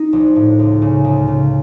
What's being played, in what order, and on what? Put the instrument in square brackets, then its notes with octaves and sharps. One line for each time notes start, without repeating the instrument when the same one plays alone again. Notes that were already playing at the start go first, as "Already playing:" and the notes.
Already playing: [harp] D#4
A#1
A2
C#2
C#3
C#2
C#3